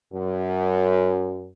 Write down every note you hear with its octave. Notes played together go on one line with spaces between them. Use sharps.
F#2